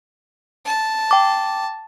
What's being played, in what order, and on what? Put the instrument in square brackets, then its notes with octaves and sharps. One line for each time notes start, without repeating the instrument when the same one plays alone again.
[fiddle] A5
[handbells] G5 D6